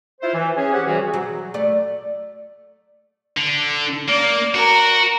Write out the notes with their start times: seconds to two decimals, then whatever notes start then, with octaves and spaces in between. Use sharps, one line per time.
0.21 E4 F4 C5
0.34 E3
0.57 C#4 G#4
0.72 C4 G4 F#5
0.86 C3 E3 G3 F#4 G#4
1.14 F#3
1.54 A3 D5
3.37 D3
4.08 A#3 D5
4.54 F#4 A#4